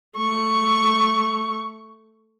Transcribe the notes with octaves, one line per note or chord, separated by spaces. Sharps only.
A3 C#6